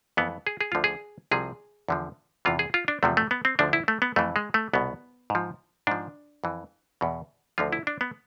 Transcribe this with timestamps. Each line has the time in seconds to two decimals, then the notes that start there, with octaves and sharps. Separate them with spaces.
0.17 F2 E3 B3
0.47 G#4
0.61 G#4
0.72 D2 D3 F3 F4
0.84 G#4
1.31 C2 C3 F3 G#4
1.89 E2 D3 F3
2.45 E2 C3 E3 F4
2.59 G#4
2.74 F4
2.88 D4
3.03 E2 C3 F3 A3
3.17 A3
3.31 B3
3.45 C4
3.59 D2 D3 F3 D4
3.73 E4
3.88 A3
4.02 B3
4.16 F2 E3 A3
4.36 G#3
4.54 A3
4.73 C2 B2 B3
5.30 G#2 F3
5.87 G#2 F3 D4
6.44 F2 E3
7.01 E2 B2
7.58 D2 D3 F3 F4
7.73 E4
7.87 D4
8.01 B3